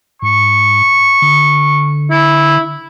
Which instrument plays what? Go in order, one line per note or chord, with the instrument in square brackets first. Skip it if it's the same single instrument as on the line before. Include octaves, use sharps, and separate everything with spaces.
[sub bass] G#2 [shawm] C#6
[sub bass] D3
[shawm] E4